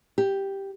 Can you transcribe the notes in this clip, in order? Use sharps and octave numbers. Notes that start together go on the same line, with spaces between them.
G4